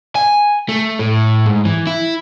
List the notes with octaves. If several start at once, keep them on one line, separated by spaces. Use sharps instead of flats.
G#5
A3
A2
G#2
E3
E4